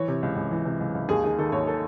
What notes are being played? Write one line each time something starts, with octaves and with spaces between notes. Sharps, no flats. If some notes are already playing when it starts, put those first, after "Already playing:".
Already playing: E3 C#5
C3
C#2
C#2
E3
C3
C#2
C#2
D#2 G#4
D#3 G#4
D#3 A4
D#2 C#5
A4